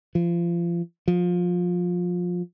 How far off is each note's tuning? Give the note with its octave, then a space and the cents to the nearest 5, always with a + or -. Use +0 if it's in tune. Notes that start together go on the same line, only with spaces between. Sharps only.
F3 -30
F3 +20